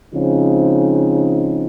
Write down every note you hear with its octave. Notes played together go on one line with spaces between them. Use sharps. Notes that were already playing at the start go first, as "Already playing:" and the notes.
C#3 F3 G#3 C4 D#4